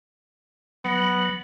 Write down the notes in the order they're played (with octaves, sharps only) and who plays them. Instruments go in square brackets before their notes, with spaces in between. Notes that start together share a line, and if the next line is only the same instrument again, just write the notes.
[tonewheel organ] F#3 [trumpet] B3